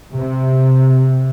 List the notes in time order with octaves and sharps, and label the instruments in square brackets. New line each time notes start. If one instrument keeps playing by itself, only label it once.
[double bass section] C3